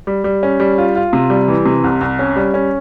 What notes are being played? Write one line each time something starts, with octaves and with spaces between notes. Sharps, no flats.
G3
G3
C#4
G3
F4
F4
C3
G3
E3
C3
C2
C2
C#4
G3
C#4